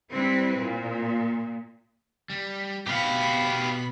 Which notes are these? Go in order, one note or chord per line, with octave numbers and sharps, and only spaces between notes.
G3 C4 E4 B4
A#2
G3
B2 G4 F5 F#5 B5